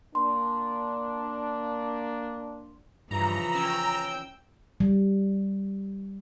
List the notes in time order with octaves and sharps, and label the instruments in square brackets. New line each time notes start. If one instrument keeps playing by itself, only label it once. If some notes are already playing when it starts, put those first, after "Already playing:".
[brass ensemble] A#3 D4 [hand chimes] C6
[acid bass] G2 [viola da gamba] C#3 E3 F3 [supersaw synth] A#5
[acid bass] C#4 [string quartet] G5 E6
[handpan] G3